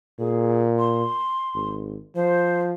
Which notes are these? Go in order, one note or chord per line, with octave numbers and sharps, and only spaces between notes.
A#2 G#4
C6
G#1
F3 C5